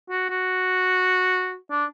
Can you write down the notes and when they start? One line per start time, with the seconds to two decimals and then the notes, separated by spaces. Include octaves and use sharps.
0.10 F#4
0.30 F#4
1.71 D4